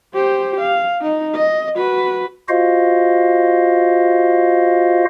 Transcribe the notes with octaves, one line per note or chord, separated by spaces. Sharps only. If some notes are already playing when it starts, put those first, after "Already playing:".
G4 C5
F5
D#4
D#5
F#4 B4
F4 F#4 C5 D#5 F5